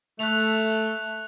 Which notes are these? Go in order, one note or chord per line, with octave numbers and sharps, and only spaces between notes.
A3 F#6 F7